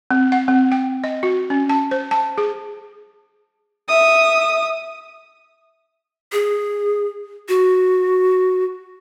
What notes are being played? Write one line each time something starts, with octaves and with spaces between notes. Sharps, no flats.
C4
F#5
C4
G5
D#5
F#4
C#4
A5
C5
A5
G#4
E5 D#6
G#4
F#4